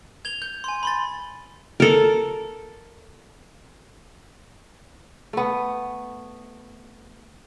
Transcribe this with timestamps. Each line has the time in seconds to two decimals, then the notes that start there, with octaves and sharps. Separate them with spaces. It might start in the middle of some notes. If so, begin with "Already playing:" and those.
0.25 G#6 F7 G7
0.42 G6
0.64 G#5 C6
0.83 B5 C6 A6
1.80 A4 A#4
5.33 A3 B3